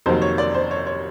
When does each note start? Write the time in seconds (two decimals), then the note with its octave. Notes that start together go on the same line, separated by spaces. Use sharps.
0.06 F2 C3 D#3 F#3 A#3 C5
0.22 C#5
0.38 D5
0.54 C5
0.71 C#5
0.87 C#5